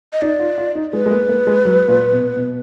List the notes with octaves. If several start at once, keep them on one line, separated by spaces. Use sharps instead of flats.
D#5
D#4 D5
F4
F4
D#4
G#3 B4
G#3
A#3
A#3
G#3
F#3
A#2
B2
B2